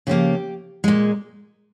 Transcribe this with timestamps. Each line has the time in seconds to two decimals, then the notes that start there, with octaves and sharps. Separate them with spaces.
0.07 C#3 F3 A#3 G4
0.84 A#2 G#3